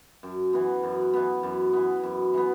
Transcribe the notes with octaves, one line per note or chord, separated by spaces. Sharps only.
F#2
E3 B3
F#2
E3 B3
F#2
E3 B3
F#2
E3 B3